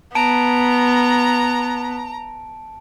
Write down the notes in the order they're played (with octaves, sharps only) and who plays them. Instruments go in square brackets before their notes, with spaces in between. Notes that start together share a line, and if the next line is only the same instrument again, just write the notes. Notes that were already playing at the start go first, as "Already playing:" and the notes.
[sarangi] B3 [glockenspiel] A5 D7 [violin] A#5